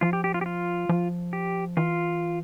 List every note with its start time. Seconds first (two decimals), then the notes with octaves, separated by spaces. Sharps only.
0.01 F3 F4
0.13 G4
0.24 G4
0.34 F4
0.41 G4
0.46 F4
0.89 F3
1.33 G4
1.77 E3 F4